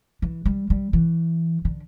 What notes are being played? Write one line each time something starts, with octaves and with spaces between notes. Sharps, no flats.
E3
G3
G3
E3
D3